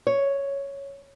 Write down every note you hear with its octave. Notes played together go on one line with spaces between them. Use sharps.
C#5